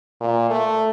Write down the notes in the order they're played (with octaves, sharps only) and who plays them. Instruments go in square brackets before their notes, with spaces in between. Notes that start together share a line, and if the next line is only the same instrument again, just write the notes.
[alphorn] A#2
A3